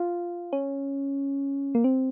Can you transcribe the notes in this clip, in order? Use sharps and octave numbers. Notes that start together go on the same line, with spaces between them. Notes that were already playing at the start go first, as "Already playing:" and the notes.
Already playing: F4
C#4
A#3
C4